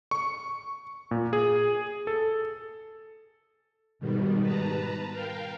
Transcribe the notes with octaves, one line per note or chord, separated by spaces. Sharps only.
C#6
A#2
G#4
A4
G#2 B2 D#3 G3
B4 A5 A#5
A#4 F5 G5